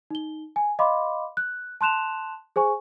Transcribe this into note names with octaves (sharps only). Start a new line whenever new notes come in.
D#4 G7
G#5
D#5 F5 B5 C6 D6
F#6
A5 C6 F#6 E7 F7
G#4 C5 G#5 C#6